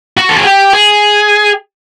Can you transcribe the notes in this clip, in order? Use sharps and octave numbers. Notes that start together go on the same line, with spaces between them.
F#4
A4
G#4
G4
G#4